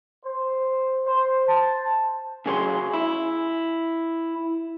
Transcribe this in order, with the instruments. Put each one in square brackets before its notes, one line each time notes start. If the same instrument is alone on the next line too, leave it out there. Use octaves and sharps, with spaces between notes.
[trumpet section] C5
C5
A5
[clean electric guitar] C#3 F#3 G#4 C#5 E5 C6
E4